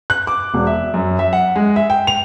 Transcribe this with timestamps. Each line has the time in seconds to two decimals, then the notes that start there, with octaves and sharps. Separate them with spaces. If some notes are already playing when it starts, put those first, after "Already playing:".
0.10 F#6
0.27 D6
0.54 E1
0.67 E5
0.94 F#2
1.19 E5
1.33 F#5
1.56 G#3
1.76 E5
1.90 G5
2.07 F7